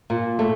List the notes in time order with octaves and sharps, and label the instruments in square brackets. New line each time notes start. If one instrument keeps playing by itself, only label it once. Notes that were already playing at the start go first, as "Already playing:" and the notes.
[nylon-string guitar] A#2
A3